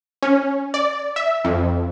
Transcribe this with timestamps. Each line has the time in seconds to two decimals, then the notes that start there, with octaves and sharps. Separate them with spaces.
0.23 C#4
0.74 D5
1.16 E5
1.45 F2